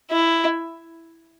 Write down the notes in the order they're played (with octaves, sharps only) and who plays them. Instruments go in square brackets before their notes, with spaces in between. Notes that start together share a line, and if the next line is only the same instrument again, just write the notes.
[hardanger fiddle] E4